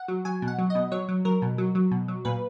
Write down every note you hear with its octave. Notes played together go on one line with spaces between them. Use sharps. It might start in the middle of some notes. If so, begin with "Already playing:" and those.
Already playing: F#5
F#3
F#3 G#5
B2
F#5
F#3
D#5
B2
F#3 C#5
F#3
F#3 A#4
B2
F#3
F#3
B2
F#3
A#2 B4